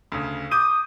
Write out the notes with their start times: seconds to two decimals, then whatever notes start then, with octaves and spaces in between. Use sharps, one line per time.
0.12 D2 C#3
0.51 D6 D#6 G6 D#7